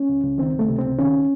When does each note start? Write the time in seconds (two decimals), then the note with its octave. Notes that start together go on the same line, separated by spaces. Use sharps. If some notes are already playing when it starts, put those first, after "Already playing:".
Already playing: C#4
0.09 C#2
0.24 C#2
0.38 D#3 C4
0.53 C#2
0.59 A3
0.69 C3
0.78 C4
0.84 C#2
0.98 D#3 C#4